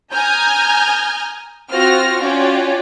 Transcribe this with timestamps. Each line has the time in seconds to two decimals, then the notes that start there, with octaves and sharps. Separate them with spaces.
0.13 G#5 A#5 D#6 F6 G6 G#6
1.70 C4 F4 F#4 F6 A#6
2.20 C#4 F4 F#4 C#5 D5 G5